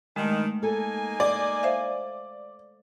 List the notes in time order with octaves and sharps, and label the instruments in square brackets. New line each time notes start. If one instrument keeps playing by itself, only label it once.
[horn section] G2 D#3 [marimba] G#3 A3
[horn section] A#3 D#4 G#5 [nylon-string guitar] A4
[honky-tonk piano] D5
[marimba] C5 E5 F5